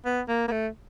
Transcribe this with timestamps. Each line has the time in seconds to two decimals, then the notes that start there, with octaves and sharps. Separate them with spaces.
0.05 B3
0.28 A#3
0.48 A#3
0.52 A3